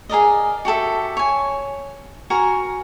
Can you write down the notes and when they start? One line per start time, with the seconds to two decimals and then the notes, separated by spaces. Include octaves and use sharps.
0.09 G#4 A#4 D5 D#5
0.65 F#4 G4 A4 E5
1.17 C#5 G#5
2.30 F#4 A#4 G#5